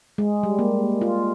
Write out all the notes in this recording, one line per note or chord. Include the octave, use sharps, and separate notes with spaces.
G#3
G3
A#3
F4